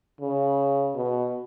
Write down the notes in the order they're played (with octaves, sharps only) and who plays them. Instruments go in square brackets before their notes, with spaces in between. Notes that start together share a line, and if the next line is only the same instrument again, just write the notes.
[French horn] C#3
B2